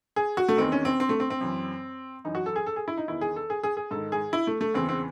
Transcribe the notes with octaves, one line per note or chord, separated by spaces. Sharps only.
G#4
F#4
A3
E2 D#3 C4
C#4
C4
C4
A3
C4
C4
F#2 E3
F#2 E3 D#4
F#4
A4
G#4
A4
G#4
E4
D#4
E2 D#3 E4
G#4
A4
G#4
G#4
G#4
G#2 D#3 A4
G#4
E4
A3
A3
E2 C#3 E3 C4
C4